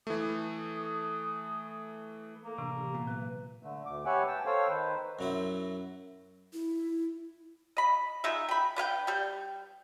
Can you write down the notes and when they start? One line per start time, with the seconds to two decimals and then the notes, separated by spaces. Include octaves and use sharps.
0.07 E3 A3 D#6
2.44 A#3 A4
2.58 A2 C3 E3 D4
2.77 G4
2.94 A#2 B3
3.07 F#3 B4
3.63 D3 A3
3.86 D2 D6
4.06 G4 B4 C#5 E5 F#5 G#5
4.27 G5 A5
4.46 A4 C5 C#5 F5 G5
4.68 D#3 B4 C5
5.19 F#2 F#3 E4
6.53 E4
7.77 D#5 B5
8.24 G#3 D#4 F4 E5
8.49 G5 B5
8.76 D4 B4 F5 G5
9.07 G3 G5